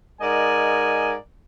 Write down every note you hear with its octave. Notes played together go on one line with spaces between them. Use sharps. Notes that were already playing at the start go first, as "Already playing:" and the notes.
G#2 A#4 D5 D#5 G#5